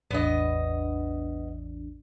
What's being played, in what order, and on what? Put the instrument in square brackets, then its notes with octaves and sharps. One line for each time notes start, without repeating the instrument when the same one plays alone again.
[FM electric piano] A1 E2 D4 [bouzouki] B3 D#5